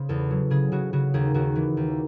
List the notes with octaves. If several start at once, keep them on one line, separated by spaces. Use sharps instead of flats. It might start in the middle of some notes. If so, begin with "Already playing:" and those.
Already playing: C#3 C5
E2 A4
F#3
C#3 G#4
C#3 F#4
C#3 F#4
D#2 G#4
D#2 F#4
E3
D#2